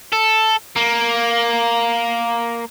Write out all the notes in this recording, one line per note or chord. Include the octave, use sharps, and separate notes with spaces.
A4
A#3